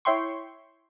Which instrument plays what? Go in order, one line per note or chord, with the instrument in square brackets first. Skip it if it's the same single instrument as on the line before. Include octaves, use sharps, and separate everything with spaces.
[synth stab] E4 C#5 E5 G5 C6 C#6